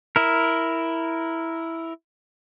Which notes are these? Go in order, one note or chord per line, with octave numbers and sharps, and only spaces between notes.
E4 A#4